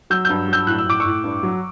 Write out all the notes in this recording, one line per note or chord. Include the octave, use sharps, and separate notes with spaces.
F#3 E6 G6
G2 E6 G6
F#3 E6 G6
A2 F#6
E6
A2 D6
C#6 E6
A2
G2
F#3